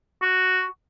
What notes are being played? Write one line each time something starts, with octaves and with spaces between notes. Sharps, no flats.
F#4